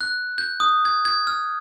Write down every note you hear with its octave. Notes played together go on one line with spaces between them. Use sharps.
F#6
G6
D#6
G#6
G#6
F6